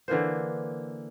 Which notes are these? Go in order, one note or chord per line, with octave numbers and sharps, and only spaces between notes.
D3 E3 A#3 C5